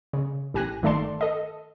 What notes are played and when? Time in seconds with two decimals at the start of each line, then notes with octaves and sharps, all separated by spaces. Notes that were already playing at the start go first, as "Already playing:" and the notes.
0.13 C#3
0.54 A1 G4 G#5 F#6 A#6
0.82 G1 D#3 A3 D5 A5 C6
1.21 A4 D#5